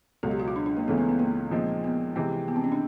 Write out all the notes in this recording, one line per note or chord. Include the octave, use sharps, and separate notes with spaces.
C#2 B2 F#3 A4
G4
F#4
F4
D4
D4
A#3
C#2 C#3 E3 A3 B3
B3
B3
A#3
A#2 F3 G#3 C4 D#4
B3
C3 E3 G#3 C4
B3
C4
C#4
D4